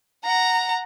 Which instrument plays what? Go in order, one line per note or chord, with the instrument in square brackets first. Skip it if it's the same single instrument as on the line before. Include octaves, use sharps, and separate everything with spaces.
[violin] F#5 A#5